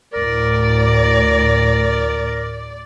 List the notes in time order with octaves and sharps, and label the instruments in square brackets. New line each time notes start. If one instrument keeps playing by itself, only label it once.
[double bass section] D2 A2 [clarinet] A#4 [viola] D5